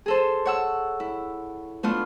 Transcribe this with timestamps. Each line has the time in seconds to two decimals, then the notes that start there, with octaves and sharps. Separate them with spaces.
0.06 G#4 A4 C5
0.46 C#5 F#5 E6
1.00 E4
1.83 A3 B3 D4 F4